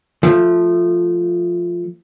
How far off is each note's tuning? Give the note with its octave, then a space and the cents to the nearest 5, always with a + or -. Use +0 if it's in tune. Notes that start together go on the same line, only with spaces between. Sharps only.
F3 +0 A3 +0